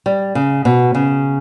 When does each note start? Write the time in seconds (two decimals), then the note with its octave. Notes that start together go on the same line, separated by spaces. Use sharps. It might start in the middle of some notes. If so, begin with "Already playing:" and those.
0.06 G3
0.35 C#3
0.65 B2
0.95 C#3